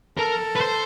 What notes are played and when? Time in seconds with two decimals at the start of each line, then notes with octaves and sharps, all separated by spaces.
0.18 A4 A#4
0.56 B4
0.61 C5